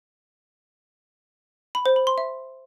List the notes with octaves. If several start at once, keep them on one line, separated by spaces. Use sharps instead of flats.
B5
C5
B5
C6
E5